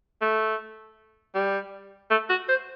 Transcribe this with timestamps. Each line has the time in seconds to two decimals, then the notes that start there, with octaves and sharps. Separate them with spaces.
0.21 A3
1.35 G3
2.10 A3
2.29 F#4
2.49 C5